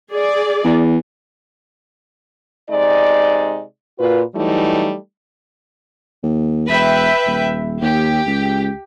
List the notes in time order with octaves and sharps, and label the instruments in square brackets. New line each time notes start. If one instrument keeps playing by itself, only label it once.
[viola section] G#4 D5
[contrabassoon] E2
[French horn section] C3 G#3 D#4 D5
A#2 F4 F#4 B4
E3 F#3 G3 A3 D#4
[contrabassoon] D#2
[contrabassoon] E1 [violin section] B4 E5 G5
[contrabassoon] D#1
[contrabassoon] D#2 [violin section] G4
[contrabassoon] C#2